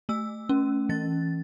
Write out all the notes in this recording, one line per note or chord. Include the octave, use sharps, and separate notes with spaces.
A3 E6
C#4
E3 A6